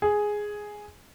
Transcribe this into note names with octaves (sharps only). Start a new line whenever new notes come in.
G#4